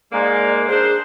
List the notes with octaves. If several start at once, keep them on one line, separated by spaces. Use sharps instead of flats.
G#2 G#3 A#3 D5
D4 G#4 A#4 C5